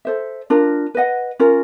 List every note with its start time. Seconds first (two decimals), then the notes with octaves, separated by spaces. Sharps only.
0.05 A4 C5 E5
0.50 D4 F4 A#4
0.95 B4 D#5 F#5
1.39 C#4 F4 A#4